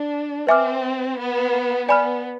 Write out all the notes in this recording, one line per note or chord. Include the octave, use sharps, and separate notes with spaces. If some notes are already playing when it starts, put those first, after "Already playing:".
Already playing: D4
C4 B4 E5 G#5 D6 F6
B3
B3 D5 G#5 B5 F6